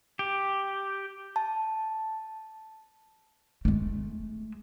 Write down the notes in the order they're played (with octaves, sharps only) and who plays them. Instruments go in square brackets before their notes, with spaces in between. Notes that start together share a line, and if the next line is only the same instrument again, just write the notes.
[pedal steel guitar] G4
[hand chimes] A5
[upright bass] G#3 A3